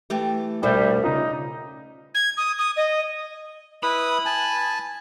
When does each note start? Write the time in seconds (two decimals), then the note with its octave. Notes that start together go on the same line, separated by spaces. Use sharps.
0.10 E3 A3 G4
0.63 C2 B2 G3 A3 D4 F#4 E5 G6
1.04 C#3 C#4 D#4 F4
2.14 G#6
2.37 D#6
2.58 D#6
2.76 D#5
3.83 E4 B4 B5 D#6
4.26 G#5 A5